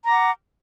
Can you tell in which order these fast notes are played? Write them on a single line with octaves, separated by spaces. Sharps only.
A#5 D6 F#5